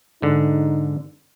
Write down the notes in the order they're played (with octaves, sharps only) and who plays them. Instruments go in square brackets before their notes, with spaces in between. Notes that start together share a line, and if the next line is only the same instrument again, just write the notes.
[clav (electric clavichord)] G#2 D3 [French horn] D#4